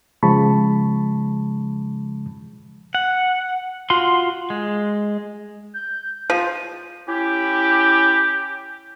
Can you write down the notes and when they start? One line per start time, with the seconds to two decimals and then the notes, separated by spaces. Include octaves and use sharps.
0.23 C#3 F3 G#3 A5 B5 C#6
2.95 F#5
3.90 F4 F#4 C6
4.50 G#3
5.74 G6
6.30 F3 F4 C5 D#7
7.07 C#4 E4 G4